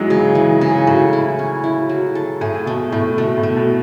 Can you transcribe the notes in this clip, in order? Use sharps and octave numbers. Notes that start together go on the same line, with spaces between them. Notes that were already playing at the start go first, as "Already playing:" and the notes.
Already playing: D#3 E3 F#3 G#3 B3
C#3
E3
C#3
A2 F#3
E4
C#4
E4
F#3
A4
A2 G#4
B2 A3
A2 A3
B2 A3
A2
A3
B2